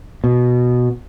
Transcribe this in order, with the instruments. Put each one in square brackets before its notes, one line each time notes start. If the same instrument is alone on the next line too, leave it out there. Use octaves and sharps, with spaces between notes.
[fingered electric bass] B2